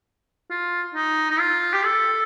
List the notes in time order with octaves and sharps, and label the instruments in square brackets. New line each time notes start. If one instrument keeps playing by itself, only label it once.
[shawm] F4
D#4
D#4
F4
G4
A4